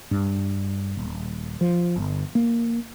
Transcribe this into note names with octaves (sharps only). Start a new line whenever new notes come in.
G2
D#1
F3
G1
A#3